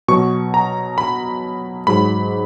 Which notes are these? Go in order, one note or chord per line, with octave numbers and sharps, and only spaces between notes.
B2 F#3 C#6
A#5
B5
G#2 F#3 B5